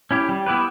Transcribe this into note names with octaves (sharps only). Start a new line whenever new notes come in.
C#4 E4 G4
G3
B3 E4 G4 B4